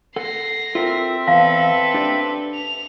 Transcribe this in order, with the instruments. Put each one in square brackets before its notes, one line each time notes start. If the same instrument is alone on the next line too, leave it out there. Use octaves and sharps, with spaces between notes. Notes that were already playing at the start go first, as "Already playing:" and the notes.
[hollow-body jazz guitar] A4 F#5 [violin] A#6 C7
[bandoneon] C4 E5 [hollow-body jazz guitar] F4 A4 A#4
[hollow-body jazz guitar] E2 [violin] A4 B4 [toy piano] F5
[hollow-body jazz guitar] D4 G4 D5
[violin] F7